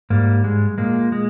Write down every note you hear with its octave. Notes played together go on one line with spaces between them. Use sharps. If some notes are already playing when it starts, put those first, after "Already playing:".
G#2 G3 A#3
G#3
A#2 G#3 A#3
G#3